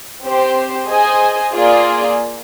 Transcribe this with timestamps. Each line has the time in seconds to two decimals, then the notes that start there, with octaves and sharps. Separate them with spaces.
0.23 C4 G4 C5
0.88 G#4 C5 D#5 G#5
1.53 A#3 F4 G#4 D5